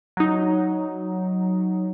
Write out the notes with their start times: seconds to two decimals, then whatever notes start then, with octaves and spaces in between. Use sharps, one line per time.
0.17 F#3 D#4